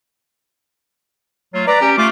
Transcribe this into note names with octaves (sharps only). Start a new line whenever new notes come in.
F#3 A3 F4
B4 D5 A#5
C#4 G4
A3 F4 D6